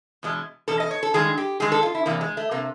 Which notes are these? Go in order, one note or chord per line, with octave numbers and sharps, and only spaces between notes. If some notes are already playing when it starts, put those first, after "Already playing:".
E2 B2 G#3
E2 B2 A4
D#5
C#5
A4
G2 D#3 G#3 G#4
G4
G2 D#3 G#3 G#4
A4
F4
E4
E2 C3 A#3
G#3
A3
C3 A#3